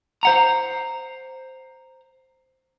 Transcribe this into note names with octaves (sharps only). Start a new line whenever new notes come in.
C5 F#5 A#5